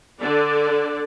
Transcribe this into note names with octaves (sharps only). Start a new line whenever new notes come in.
D3 D5